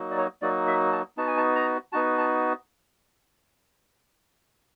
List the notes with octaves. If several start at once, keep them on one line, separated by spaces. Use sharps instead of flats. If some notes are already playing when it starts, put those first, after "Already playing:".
Already playing: F#3 A#3 D#4 F#4
D5
C#5
F#3 A#3 D#4 F#4 D5
E5
A5
B3 D#4 F#4 A5
G#5
A5
A#5
B3 D#4 F#4 A5
A5